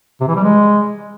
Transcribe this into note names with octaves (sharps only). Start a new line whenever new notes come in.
C3
E3
G3
G#3